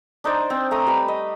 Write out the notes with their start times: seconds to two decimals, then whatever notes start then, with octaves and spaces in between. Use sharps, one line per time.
0.24 D4 D#4 C5 D5
0.50 C4
0.71 A3 A#5 D#6
0.87 G3 B4 B5
1.08 D#5